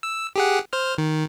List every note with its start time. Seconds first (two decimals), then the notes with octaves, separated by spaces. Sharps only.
0.03 E6
0.36 G4 G#4 F#5
0.73 C5 F6
0.98 D#3